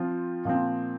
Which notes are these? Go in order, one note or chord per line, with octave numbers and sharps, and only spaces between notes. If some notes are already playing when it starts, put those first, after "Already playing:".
Already playing: F3 C4 F4
A#2 F3 C4